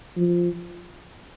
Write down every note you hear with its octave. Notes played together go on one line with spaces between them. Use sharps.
F3